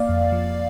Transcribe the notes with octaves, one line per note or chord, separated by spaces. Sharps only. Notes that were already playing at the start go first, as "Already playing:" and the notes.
Already playing: A#3 D5 F5
F2
F3